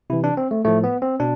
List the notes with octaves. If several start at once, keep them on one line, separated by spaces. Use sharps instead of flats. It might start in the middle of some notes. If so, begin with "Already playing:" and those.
C3 E3 E4
D4
C4
A3
A2 F3 A3
B3
C4
B2 D4